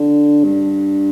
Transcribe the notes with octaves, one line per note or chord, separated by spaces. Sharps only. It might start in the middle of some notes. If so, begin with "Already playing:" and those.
Already playing: D3
G2